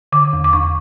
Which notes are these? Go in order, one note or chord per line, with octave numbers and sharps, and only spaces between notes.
D3 D6
E2
D6
E2 C#6